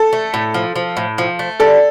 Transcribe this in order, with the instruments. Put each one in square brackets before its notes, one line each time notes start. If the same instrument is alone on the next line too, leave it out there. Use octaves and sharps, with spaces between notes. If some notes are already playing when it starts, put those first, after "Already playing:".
Already playing: [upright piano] A4
[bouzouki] A3
A2
F3
F3
A2
F3
A3
[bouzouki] G3 [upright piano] A4